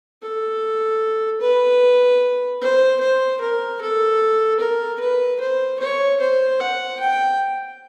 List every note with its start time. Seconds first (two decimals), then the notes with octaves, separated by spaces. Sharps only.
0.22 A4
1.41 B4
2.61 C5
3.00 C5
3.41 A#4
3.81 A4
4.60 A#4
5.00 B4
5.40 C5
5.79 C#5
6.20 C5
6.60 F#5
6.99 G5